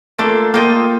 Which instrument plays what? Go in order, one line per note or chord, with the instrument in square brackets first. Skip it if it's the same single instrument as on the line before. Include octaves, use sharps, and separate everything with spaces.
[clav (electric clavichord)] A3 [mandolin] A#3 D4 F4 A4
[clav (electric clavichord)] A#3 [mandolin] F4 A4 D#5 G5